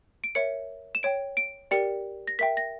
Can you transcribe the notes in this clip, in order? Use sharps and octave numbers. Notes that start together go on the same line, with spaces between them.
D7
A#4 C#5 E5 C#7
E7
C#5 G5 D7
D7
G4 A#4 D5 G5 C#7
A#6
A#4 E5 G5 B6
A#6